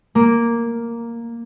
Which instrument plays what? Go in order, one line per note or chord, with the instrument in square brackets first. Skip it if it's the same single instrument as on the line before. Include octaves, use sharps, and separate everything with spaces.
[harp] A#3